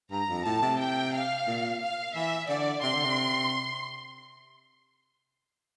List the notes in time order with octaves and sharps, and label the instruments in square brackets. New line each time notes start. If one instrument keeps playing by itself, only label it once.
[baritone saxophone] G2 [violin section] A#5
[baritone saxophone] F2
[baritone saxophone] A2 [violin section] A5
[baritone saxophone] C3
[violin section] G5
F5
[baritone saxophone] A#2
[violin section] F5
[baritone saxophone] E3 [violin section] E5
[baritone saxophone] D3 [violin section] D5
[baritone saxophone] C3 [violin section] C6
[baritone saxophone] D3
C3